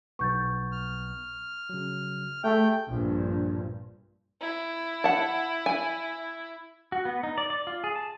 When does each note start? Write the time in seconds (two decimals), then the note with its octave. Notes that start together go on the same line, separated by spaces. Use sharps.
0.19 B1 B3 C#6 G6 A6
0.72 F6
1.69 C#3 F#3
2.44 A3 G4 G#4 E5 G5
2.89 A#1 G2
4.41 E4
5.04 F#5 A5
5.66 G#5
6.92 F#4
7.05 B3
7.23 D#4
7.38 D5
7.50 D5
7.67 F4
7.84 G#4
7.95 A5